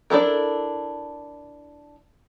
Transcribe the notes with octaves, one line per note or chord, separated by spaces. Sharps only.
D4 E4 A4 A#4